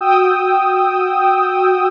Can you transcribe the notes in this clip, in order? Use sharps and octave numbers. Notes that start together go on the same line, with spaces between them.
F#4 G5 D#6 E6